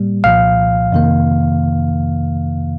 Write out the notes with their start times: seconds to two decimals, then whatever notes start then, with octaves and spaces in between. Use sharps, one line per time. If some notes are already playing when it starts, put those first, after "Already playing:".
Already playing: A2 G3 A#3
0.24 C2 A#2 F3 F5
0.92 F2 C3 D#3 A#3